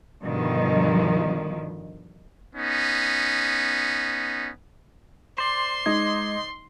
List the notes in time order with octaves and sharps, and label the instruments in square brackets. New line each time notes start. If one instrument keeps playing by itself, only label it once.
[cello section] G2 B2 D3 D#3 F3
[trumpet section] B3 C#4 D#4
[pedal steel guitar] C5 D5 [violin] C6
[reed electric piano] G#3 G#6 [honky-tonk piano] D#4